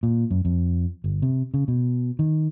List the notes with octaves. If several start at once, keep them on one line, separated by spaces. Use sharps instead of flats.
A#2
F#2
F2
G1
C3
C#3
B2
D#3